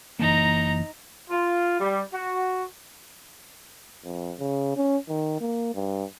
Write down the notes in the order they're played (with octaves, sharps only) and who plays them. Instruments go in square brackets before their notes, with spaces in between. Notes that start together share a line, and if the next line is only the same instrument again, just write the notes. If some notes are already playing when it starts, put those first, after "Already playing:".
[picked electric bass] F#1 E3 A#3 [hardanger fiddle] D#4 A#5
[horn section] F4
G3
F#4
[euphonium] F2
C#3
C#4
D#3
A#3
G2